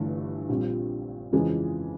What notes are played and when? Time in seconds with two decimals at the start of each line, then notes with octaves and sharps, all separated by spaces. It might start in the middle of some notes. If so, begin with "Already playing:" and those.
Already playing: G1 G2 E3 A3
0.49 A#1 A#2 G3 C4
1.32 F2 C#3 E3 G#3